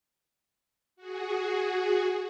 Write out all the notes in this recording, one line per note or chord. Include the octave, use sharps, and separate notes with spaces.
F#4 G#4